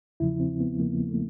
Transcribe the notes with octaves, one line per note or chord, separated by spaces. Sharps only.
E2 C#3 F3 E4
C4
B3
E2 C#3 F3 A#3
A3